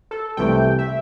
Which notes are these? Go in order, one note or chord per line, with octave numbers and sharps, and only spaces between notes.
A4
C2 C3 E3 A3 G5
E5